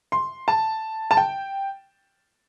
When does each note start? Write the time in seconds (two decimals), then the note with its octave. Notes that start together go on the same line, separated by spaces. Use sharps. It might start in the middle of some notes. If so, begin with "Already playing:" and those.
0.12 C6
0.48 A5
1.11 A5
1.17 G5